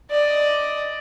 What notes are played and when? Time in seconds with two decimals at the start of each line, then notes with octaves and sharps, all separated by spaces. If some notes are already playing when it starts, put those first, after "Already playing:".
0.11 D5 D#5